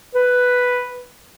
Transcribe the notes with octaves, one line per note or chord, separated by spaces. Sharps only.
B4